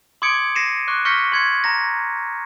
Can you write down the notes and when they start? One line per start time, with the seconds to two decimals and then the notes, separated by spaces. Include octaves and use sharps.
0.22 C6 D6 D#6 G#6 C#7 D7
0.55 A#6 C7 C#7 D#7 E7
0.88 C#6 D6 F#6
1.05 C#6 F6 G6 A#6 B6 C#7
1.32 C6 G#6 C#7
1.64 A#5 A#6